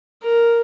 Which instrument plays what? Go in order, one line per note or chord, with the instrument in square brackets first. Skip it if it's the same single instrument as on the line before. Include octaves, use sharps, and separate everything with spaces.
[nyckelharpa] A#4